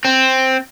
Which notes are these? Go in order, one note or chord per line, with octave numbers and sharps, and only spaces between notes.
C4